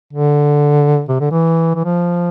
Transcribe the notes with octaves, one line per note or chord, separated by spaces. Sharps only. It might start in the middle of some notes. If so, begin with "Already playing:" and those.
D3
C3
D3
E3
E3
F3